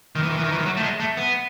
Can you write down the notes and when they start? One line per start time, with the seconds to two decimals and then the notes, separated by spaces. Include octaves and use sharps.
0.16 D#3
0.23 E3
0.30 D#3
0.37 E3
0.44 D#3
0.52 E3
0.58 D#3
0.66 F#3
0.77 A3
0.83 G#3
1.00 A3
1.17 B3